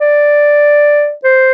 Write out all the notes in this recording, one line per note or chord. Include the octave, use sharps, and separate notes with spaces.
D5
C5